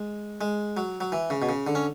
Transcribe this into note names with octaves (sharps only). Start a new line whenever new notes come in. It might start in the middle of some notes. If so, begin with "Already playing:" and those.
Already playing: G#3
G#3
F#3
F#3
E3
C#3
B2
C#3
D3
C#4